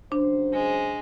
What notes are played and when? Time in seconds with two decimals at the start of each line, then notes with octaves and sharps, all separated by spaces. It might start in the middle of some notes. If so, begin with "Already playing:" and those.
0.12 C#3 F#3 D4 C5
0.52 G#3